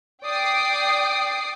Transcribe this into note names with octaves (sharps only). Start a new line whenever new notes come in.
D5 G5 D6 D#6 C7